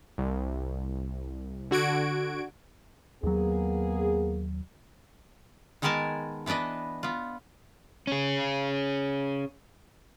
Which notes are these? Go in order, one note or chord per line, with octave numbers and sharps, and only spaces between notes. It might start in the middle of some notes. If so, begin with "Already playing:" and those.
C2
D3 F#4 G#6 D7
D#2 F#3 A#3 B3 G#4
D#3 G#3 B3 A#4 G#5 A5
E3 B3 D4 B4 D#5
B3 F4
C#4 G#4